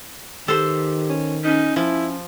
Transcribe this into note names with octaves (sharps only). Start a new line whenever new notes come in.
D#3 G4 A4 C5
C#4
C#4 D#4
F3 E4